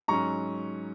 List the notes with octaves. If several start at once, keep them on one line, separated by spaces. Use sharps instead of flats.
G#2 F#3 C#4 A#5 C#6